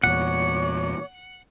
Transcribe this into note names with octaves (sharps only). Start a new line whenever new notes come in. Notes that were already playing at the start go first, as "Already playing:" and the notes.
E2 A#2 C#5 F#5 D6